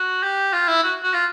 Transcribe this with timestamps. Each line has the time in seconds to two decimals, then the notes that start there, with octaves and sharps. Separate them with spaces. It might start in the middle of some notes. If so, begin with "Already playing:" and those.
Already playing: F#4
0.23 G4
0.53 F4
0.68 E4
0.83 F#4
1.03 F#4
1.14 F4